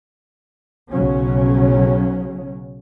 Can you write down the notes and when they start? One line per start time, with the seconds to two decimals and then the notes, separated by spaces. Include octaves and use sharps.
0.91 B1 C#3 F#3 C#4